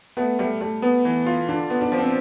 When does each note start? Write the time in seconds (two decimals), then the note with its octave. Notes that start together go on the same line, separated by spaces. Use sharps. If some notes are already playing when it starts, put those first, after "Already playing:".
0.17 A3 B3
0.39 G3 A3
0.61 G3 A3
0.82 B3
1.05 E3
1.26 F4
1.48 D3 D4
1.70 B3
1.81 D4
1.92 F3
1.98 C4